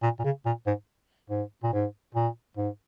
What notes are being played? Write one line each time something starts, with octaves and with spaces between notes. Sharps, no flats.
A#2
A#2
C#3
A#2
G#2
G#2
A#2
G#2
A#2
G#2